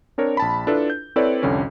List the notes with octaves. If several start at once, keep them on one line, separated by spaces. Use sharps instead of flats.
C4 D4 A#4 C#5
A#1 A5 B5
D4 E4 F4 A4 B4
G6
C4 E4 A4 B4 C#5 D5
C2 F2 D3 C#4